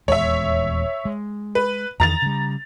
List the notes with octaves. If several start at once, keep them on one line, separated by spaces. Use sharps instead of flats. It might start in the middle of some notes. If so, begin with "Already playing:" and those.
D#1 E2 G#3 C#5 E5
G#3
B4
E2 D#3 A#5 A6 F7
C#3 G3